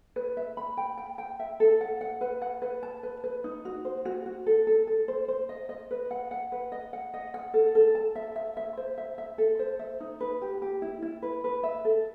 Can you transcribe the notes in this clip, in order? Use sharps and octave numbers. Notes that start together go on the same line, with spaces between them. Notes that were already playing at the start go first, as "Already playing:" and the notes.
B4
E5
B5
G5
G5
G5
E5
A4
F#5
F#5
B4
F#5
B4
A5
B4
B4
D#4
F#4
C5
F#4
F#4
A4
A4
A4
C5
C5
D#5
D#5
B4
F#5
F#5
B4
D#5
F#5
D#5
F#5
A4
A4
A5
E5
E5
E5
C5
E5
E5
A4
C5
E5
D#4
B4
G4
G4
E4
E4
B4
B4
E5
A4